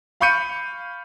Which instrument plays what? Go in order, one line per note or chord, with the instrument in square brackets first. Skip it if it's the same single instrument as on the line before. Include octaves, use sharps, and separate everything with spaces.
[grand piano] F5 B5 C#6 G6 C#7 D#7